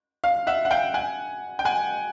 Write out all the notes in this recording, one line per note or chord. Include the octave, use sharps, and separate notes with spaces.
F5
E5 F#5
F#5
F5 G5
F#5 G#5
G5
F#5 G#5